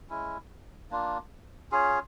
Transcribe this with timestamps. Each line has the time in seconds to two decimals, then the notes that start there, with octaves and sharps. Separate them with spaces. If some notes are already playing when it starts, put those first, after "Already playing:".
0.09 G#3 C#4 E4
0.91 A#3 D4 F4
1.71 C#4 F4 G#4 C#5